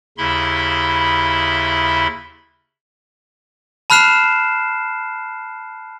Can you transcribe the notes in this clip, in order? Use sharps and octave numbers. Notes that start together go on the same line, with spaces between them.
D#2 C#3 E4 E5 B5 C6
A5 B5 F6 F#6 C7 E7